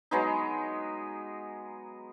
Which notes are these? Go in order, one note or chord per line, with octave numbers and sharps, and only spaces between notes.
F#3 G#3 B3 D#4